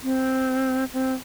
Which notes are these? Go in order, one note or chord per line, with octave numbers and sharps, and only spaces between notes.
C4
C4